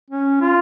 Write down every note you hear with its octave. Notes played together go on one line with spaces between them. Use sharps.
C#4
F4